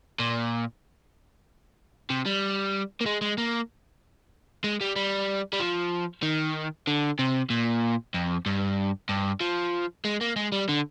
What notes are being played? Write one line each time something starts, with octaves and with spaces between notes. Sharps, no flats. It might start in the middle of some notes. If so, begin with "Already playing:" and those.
A#2
C3
G3
A#3
G#3
G#3
A#3
G#3
G3
G3
G3
F3
D#3
D3
C3
A#2
F2
G2
G2
F3
G#3
A#3
G#3
G3
D3